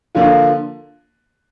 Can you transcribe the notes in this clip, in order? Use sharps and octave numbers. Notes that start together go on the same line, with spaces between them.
D3 F3 A#3 F4